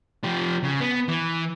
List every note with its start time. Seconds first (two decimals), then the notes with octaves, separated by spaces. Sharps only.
0.24 F3 G4
0.63 C#3
0.81 B3
1.08 E3